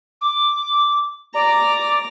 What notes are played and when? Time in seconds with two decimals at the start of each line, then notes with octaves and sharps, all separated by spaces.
0.21 D6
1.34 D5 A#5 D6